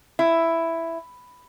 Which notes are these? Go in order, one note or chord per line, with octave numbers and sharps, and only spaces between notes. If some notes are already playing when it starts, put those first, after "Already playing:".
E4